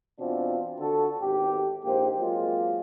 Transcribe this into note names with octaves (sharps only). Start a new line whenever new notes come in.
B2 E3 C4 D4 F4
D3 F#4 A4
G#1 B2 G4
A#1 G#2 A#3 G4 C5
F#3 G#3 A#3 C4 F4